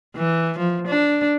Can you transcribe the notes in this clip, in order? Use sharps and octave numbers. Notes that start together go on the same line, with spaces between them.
E3
F3
D4